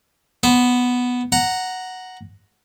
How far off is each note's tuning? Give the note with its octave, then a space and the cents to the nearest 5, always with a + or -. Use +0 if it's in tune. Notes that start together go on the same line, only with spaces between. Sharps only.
B3 +0 C5 +0
F#5 +0 A#5 +0